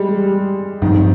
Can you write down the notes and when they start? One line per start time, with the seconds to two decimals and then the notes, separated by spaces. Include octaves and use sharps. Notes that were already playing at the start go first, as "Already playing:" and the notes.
Already playing: G3 G#3
0.22 G3
0.82 G2 D#3 F3 C4